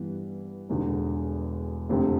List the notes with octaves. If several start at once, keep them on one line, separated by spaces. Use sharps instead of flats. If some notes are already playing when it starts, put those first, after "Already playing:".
Already playing: G2 E3 B3
E1 E2 D3
F1 F2 D3 A3 C4